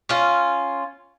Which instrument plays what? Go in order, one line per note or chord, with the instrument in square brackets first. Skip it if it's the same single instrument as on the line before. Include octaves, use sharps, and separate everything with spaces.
[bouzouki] C#4 F4